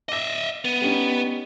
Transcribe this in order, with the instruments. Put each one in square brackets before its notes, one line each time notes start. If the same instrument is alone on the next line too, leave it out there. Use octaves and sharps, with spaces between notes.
[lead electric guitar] D#5 E5 [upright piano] D6 A#6
[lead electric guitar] B3
[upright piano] G3 C#4 D#4